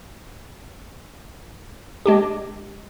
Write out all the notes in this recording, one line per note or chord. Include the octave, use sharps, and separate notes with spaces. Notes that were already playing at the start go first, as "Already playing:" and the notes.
G#3 D4 G4